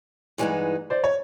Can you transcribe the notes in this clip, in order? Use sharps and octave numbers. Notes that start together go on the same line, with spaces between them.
G2 E3 G#3 B3 D#4
C5 D5
C#5